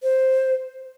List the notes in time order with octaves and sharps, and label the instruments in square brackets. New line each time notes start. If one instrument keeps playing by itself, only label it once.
[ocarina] C5